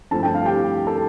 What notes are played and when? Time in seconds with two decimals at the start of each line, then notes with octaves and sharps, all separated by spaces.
0.11 G2 F3 A3 C4 E4 A5
0.23 G5
0.35 F5
0.45 G4 G5
0.87 A4 A5